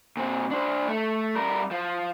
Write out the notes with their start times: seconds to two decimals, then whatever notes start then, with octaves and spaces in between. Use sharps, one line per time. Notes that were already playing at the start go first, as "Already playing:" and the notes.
0.17 A#2 C4
0.51 D4 C5
0.88 A3
1.36 G3 A#4
1.71 F3